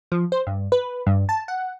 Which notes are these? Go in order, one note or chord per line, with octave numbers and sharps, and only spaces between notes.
F3
C5
G2
B4
G2
A5
F#5